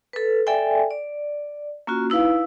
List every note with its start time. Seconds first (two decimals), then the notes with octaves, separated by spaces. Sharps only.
0.13 A4 B4
0.47 A4 D5 E5 G5 G#5
0.91 D5
1.87 A#3 C#4 F4 F#4
2.10 D#4 E4 B4 F5